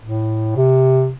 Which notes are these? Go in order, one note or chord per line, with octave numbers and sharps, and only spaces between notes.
A2
C3